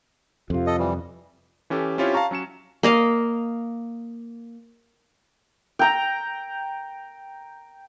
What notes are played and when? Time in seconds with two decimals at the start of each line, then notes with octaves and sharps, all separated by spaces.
0.50 F2 C3 F4
0.67 A4 D#5
0.79 E3 G3
1.70 E3 C#4 G4 A4
1.98 C4 C#4 E4 F4 G4 C#5
2.14 F5 A5 A#5 C#6
2.31 F#3 C#4 C#7 E7
2.83 A#3 D#5 F5
5.79 G5 A#5